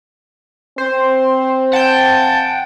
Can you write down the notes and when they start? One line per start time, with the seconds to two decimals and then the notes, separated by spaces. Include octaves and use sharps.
0.78 C4 C5
1.73 F#5 G5 A5 G6